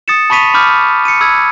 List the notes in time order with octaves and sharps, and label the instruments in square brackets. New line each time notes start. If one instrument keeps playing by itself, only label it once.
[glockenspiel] D#6 A6 C#7 E7
A5 B5 C#6 B6 D#7 F7
B5 D6 F6 G6
C#7 D#7
B5 E6 G#6